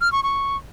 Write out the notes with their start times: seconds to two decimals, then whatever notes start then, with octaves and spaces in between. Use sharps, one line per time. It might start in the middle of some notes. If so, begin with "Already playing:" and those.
0.01 F6
0.12 C#6
0.23 C#6